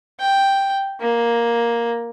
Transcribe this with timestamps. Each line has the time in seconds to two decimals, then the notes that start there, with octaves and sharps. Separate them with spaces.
0.19 G5
1.01 A#3